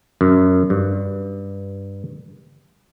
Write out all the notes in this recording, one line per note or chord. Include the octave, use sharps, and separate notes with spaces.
F#2
G2